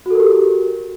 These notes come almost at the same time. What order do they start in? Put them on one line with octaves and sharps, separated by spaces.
F#4 A4 A#4 G4